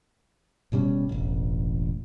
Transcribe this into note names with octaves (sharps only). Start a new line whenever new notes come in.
D#1 B2 G3 C#4
E1 A1